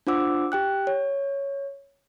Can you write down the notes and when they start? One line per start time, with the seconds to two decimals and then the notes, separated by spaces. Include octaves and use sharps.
0.07 D4 F4 C5 F#5 D6 E6
0.52 G4 G5 F#6
0.87 C#5